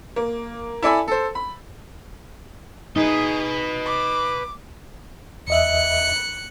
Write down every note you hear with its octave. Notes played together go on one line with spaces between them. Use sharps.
A#3
E4 A4 D5 E5 G#5 B5
A4 C5
B5
D#4 G#4 B4 D#5
D6
E2 D#5 E5 F#6 C#7